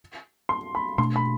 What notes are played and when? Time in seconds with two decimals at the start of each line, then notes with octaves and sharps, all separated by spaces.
0.49 C6
0.75 B5
0.98 B2 A3 D4 C6
1.16 B5